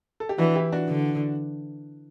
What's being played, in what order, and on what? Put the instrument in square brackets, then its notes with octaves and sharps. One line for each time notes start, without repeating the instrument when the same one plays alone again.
[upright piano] A4
G4
[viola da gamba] E3 [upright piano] D4 F#4
[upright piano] E4 G4
D4 F#4
[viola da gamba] D3